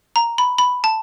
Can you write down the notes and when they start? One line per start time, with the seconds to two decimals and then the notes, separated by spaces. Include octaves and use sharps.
0.16 A#5
0.38 B5
0.58 B5
0.84 A5